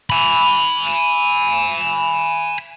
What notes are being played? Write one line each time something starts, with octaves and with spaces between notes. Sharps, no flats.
G#5 B5